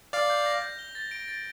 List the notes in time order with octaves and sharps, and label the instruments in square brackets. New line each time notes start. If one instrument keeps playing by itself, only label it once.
[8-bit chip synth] D5 F5 [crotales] F7
[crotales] G6
A#6
G6
G7
A6
D7
A6